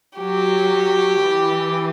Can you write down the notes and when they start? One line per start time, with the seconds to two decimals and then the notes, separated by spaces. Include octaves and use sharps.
0.18 F#3 G4
1.21 E3